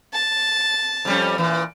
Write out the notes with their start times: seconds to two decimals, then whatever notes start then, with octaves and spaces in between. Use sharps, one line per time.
0.13 A5
1.05 F2 G3 C#4
1.38 A#2 E3